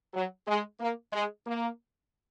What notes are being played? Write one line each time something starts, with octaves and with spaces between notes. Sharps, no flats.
F#3
G#3
A#3
G#3
A#3